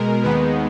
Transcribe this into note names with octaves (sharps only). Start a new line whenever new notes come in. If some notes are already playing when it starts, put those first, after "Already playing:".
Already playing: B2 G#3 A#4
D#2 D#3 G#3 B3 B4